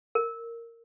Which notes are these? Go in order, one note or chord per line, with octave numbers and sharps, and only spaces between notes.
A#4